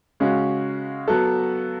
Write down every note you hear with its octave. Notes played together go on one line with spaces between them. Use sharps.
C#3 G#3 C#4 F#4
F#3 B3 F#4 A4